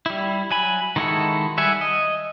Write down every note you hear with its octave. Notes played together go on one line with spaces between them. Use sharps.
G3 E4
F#3 G#5 B5
D#3 G#3 E4 F#4 A4
G3 E5 F#5 G#5
D#5